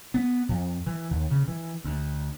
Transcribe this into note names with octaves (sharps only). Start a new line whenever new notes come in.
B3
F2
E3
D#2
C#3
E3
D2